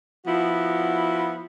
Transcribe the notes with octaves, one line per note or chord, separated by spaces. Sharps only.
F3 B3 E4 F#4